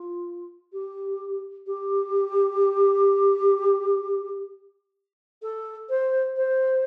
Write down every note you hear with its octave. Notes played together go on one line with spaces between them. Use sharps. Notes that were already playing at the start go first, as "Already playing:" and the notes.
Already playing: F4
G4
G4
A4
C5
C5